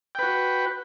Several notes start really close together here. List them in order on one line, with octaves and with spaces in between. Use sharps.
G5 B4 F#4